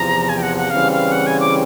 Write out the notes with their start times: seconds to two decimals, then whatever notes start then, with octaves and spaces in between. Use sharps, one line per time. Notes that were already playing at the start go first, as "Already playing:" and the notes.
Already playing: E2 C3 F3 A#5
0.29 G#5
0.38 G5
0.42 F#5
0.57 F#5
0.70 C#3 E3 G3 C4 F5
0.92 F5
1.12 F#5
1.26 G#5
1.40 D6